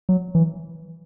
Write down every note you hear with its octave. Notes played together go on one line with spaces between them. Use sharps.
F#3
E3